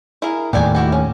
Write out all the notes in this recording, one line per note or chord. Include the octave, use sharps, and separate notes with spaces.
E4 G#4 A#4
D#2 A2 G4 D5 G#5
E4 F#4 G4
C#4